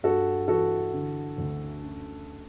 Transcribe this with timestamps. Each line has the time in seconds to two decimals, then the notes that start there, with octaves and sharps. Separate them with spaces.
0.03 G2 F#4 A4
0.48 E3 F#4 A4
0.94 D3
1.38 D2
1.83 F#2